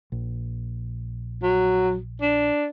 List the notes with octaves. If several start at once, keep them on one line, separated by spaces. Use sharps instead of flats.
A#1
F#3
D4